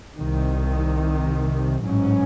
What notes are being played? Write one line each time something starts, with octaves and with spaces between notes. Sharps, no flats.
C2 C3 D#3
A1 G#2 F#3 C#4